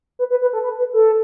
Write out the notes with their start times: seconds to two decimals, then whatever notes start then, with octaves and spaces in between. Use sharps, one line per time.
0.19 B4
0.31 B4
0.42 B4
0.53 A4
0.64 B4
0.79 B4
0.94 A4